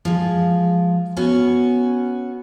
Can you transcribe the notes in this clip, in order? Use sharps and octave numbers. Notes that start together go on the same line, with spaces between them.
F3 G#3
B3 C#4 F#4